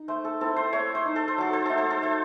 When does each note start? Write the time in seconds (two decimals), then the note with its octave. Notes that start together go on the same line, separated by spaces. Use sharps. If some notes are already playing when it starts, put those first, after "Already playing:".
Already playing: D#4
0.08 A3 C5
0.25 A4
0.41 C4 E4 A4
0.56 C5
0.73 A3 C#5
0.95 C5
1.05 D#4
1.16 A4
1.28 C5
1.38 F#3 A4
1.53 C5
1.66 A3 D#4 A4
1.78 C5
1.90 A4
2.02 A3 C5